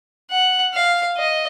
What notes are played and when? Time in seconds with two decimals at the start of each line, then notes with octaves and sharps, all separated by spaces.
0.31 F#5
0.74 F5
1.17 D#5